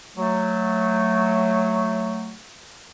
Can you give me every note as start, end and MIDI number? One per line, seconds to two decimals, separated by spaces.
0.17 2.35 54
0.17 2.35 57